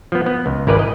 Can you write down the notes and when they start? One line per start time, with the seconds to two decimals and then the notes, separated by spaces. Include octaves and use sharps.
0.12 F3 B3
0.26 B3
0.46 C#2
0.67 G#1 E4 A#4 B4 D5
0.79 D#5